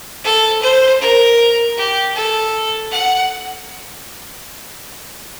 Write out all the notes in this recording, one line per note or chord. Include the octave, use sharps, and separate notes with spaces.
A4
C5
A#4
G4
A4
F#5